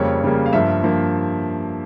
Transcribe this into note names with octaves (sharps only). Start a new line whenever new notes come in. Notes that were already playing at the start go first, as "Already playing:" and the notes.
Already playing: F2 C#3 G3 A#3 C#5
F2 C#3 G3 A#3
F5
G2 F3 A#3 E5
G2 F3 A#3